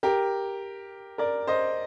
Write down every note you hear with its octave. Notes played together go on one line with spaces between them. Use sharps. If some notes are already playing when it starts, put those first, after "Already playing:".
G4 A#4
A#4 D5
C5 D#5